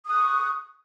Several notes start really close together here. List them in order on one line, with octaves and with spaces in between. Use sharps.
D#6 F#6 C#6